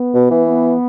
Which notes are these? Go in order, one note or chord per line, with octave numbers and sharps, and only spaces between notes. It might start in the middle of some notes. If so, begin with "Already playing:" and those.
Already playing: B3
B2
E3
B3